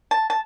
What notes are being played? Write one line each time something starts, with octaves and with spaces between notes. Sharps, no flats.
A5
A5